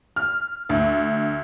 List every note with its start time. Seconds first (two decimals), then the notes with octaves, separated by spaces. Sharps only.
0.16 F6
0.69 D2